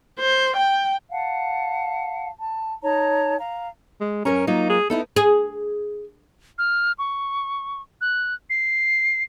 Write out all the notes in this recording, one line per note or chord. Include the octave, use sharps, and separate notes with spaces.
C5
G5
F5 F#5 A5
A5
D#4 C#5 A5 A#5
F5 A#5
G#3
F#2 C#4 A#4 A#5
F#3 A#3 D#4 F4
G#4
B3 D#4 E4 A4
G#4
F6
C#6
F#6
C7